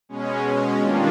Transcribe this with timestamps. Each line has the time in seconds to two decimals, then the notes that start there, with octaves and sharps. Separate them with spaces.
0.09 B2 G#3 C#4
0.79 D#3 G3 A#3 D4 F4